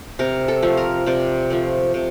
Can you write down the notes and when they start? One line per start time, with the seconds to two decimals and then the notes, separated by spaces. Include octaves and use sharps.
0.19 C3 A#4
0.48 A4
0.62 F3 A3
0.77 A#4
1.06 C3 D5
1.50 F3 A3
1.94 C3